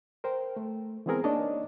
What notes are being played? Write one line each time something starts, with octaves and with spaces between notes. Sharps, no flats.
A#4 C5 G5
A3
E3 G#3 B3 C4 G#4 A#4
A#3 D4 D#4 C#5 D#5 A5